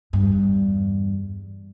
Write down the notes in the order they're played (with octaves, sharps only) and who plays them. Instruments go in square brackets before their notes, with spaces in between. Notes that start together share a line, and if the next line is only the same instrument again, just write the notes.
[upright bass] E2 G2